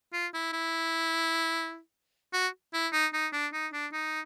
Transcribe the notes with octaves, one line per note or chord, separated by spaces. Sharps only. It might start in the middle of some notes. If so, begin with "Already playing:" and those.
F4
E4
E4
F#4
E4
D#4
D#4
D4
D#4
D4
D#4